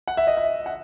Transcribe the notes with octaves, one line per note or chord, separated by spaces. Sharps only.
F#5
E5
D#5
E5
F#5